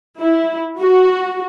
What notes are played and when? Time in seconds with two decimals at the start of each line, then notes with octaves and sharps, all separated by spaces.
0.21 E4
0.80 F#4